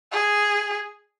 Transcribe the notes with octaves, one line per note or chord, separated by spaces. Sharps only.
G#4